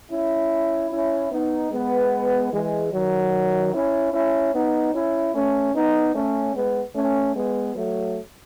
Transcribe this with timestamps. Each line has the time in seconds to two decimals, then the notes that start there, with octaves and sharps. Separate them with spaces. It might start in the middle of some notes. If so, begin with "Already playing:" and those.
0.11 C#4 E4
0.91 C#4 E4
1.32 B3 D#4
1.72 G#3 B3
2.53 E3 G#3
2.92 D#3 F#3
3.73 C#4 E4
4.14 C#4 E4
4.54 B3 D#4
4.94 C#4 E4
5.35 A3 C#4
5.75 B3 D#4
6.15 A3 C#4
6.55 G#3 B3
6.95 A3 C#4
7.36 G#3 B3
7.76 F#3 A3